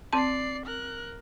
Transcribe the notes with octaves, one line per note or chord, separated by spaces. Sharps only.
C4 D5 A5 C7
A#4 F#6